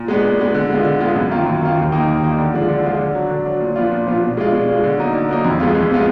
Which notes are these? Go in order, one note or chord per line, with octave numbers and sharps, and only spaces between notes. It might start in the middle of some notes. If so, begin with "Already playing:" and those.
Already playing: A#2
G#3 B3 D4
A#2
G#3 B3 D4
D3
G#3 B3 F4
D3
G#3 B3 F4
F#2
D#3 A#3 F4
F#2
D#3 A#3 F4
D#2
D#3 A#3 D#4
D#2
D#3 A#3 D#4
D3
F3 G#3 D4 F4
D3
F3 G#3 D4 F4
D3
F#3 D4
D3
F#3 D4
A#2
F3 B3 D4 F4
A#2
F3 B3 D4 F4
B2
G#3 D4 F4
B2
G#3 D4 F4
D3
F#3 A#3 D#4
D3
F#3 A#3 D#4
F2
F3 G#3 B3 F4
F2
F3 G#3 B3 F4